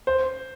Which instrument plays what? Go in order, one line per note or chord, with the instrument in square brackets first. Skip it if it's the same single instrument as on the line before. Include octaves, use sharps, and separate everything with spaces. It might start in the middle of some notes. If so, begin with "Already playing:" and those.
[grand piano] C5